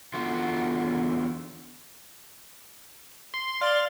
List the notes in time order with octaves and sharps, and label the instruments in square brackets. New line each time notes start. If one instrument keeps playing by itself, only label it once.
[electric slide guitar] E2 D3 F4 F#4
[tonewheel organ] C6
[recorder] D5 [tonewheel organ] F5 [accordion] C6